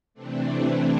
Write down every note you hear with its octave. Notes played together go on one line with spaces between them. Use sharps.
C3 E3 A3 C4 D4
E4